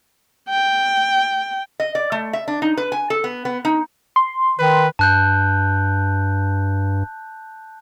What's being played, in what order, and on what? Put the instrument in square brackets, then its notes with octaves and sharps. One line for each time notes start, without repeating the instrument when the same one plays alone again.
[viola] G5
[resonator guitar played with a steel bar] D#5
D5
A3
E5
D4
D#4
B4
G#5
A4
B3
B3
D#4
[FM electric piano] C6
[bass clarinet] D#3 [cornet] B4
[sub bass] G2 [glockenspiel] A5 F#6 G6